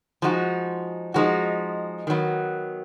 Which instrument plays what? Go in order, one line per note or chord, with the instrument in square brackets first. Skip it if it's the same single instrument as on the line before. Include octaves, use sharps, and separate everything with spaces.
[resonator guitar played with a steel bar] F3 G#3 D#4 F#4
F3 G#3 D#4 F#4
D#3 F#3 B3